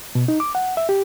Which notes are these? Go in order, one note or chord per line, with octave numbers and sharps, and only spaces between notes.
B2
D#4
D6
F#5
E5
G4